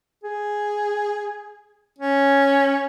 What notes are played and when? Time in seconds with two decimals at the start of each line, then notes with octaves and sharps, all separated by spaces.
0.24 G#4
1.99 C#4